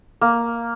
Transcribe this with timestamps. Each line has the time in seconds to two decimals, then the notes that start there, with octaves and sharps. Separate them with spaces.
0.21 A#3